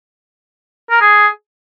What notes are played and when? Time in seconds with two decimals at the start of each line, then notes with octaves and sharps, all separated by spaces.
0.90 A#4
1.01 G#4